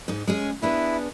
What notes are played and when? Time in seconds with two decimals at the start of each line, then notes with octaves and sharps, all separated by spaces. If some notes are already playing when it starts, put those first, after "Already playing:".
0.08 G#2 D#4
0.27 G#3 C#4 G#4
0.62 B3 D4 E4 G#4